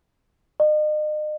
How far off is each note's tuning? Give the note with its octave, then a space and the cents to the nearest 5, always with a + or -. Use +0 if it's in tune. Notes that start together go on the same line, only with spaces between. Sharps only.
D#5 -40